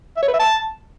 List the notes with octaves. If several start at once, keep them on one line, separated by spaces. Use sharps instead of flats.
E5
C#5
B4
E5
A5